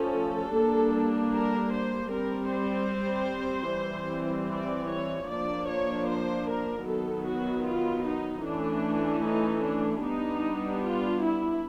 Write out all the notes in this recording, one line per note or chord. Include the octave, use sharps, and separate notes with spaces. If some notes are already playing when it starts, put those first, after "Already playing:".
Already playing: F3 A3 C#4 A4
G3 A#3 D4
A#4
C5
G3 C4 A#4
C5
E3 G3 C4
D5
C#5
F3 A#3 D4 D5
C#5
C5
A#4
D#3 F#3 B3 A4
F#4
F4
D#4
E3 A3 C#4 D4
D#4
D4
G3 B3 D4 D#4
F4
E4